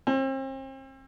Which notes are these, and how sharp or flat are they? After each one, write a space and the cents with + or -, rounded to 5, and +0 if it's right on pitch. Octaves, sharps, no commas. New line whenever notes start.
C4 +40